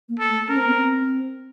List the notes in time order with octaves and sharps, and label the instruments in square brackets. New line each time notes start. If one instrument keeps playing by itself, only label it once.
[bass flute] A#3
[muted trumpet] A4
[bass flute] A3
[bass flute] C#4 [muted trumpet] A#4
[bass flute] C4
B3
C4